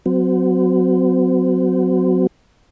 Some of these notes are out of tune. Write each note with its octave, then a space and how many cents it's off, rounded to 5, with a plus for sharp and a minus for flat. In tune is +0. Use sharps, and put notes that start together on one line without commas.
F#3 -5 C4 -35